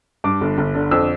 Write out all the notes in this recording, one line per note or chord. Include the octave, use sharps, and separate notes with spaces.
G2 D6
G1
G1
D3
F2 E6